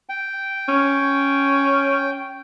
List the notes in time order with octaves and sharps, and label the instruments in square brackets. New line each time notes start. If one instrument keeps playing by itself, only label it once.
[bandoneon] G5
[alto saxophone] C#4